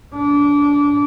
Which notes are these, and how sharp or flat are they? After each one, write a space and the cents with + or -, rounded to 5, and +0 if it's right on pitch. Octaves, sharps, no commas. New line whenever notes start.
D4 -25